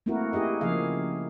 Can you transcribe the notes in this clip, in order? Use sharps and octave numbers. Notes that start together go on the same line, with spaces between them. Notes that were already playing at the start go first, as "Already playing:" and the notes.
A3 A#3 C4 E4 F#4 A#4
E4 G4 G#4 D#5
C#3 F3 A#3 G#4 F5